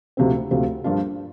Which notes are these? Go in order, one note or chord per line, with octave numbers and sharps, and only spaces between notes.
D2 C3 F3 C4
D2 C3 F3 C4 G4
G2 F3 A#3 D4 F4